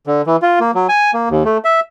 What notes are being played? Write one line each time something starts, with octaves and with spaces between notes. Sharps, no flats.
D3
E3
F4
A#3
F#3
G#5
A#3
D#2
A3
E5